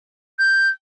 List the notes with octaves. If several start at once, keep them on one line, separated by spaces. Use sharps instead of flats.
G6